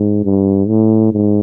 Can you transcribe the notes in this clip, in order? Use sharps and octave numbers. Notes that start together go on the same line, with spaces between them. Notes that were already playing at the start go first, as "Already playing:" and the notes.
Already playing: G#2
G2
A2
G#2